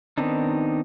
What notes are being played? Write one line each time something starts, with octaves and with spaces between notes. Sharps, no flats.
D#3 B3 C4 D4 D#4